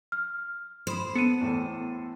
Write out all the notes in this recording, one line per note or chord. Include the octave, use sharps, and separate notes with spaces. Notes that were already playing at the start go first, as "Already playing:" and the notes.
F6
C5 B5 D#6 E7
B3 A4 C#7 D#7
E2 A2 A4